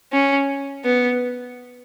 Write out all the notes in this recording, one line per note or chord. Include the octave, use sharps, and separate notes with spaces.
C#4
B3